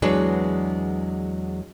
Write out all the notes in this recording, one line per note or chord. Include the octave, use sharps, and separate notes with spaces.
E2 F#3 G#3 D4 G#4 B4